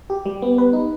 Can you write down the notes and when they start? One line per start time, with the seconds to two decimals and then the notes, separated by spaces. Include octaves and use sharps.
0.10 G4
0.25 G3
0.42 B3
0.58 B4
0.73 D#4